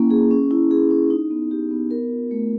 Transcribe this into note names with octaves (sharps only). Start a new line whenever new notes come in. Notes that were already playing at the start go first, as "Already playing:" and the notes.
Already playing: A#3 C#4 E4
G#4
C#4
E4
G#4
C#4
D#4
B3
G4
B3
A#4
F4
A3